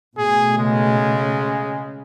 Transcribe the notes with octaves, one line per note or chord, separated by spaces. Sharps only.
B2 A3 G#4
C#3 G#3